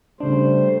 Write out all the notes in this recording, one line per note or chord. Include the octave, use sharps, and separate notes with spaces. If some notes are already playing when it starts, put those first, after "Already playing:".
C#3 G3 A3 D4 C5